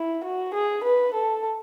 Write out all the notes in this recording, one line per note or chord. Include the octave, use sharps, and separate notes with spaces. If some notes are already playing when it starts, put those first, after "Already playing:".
Already playing: E4
F#4
G#4
B4
A4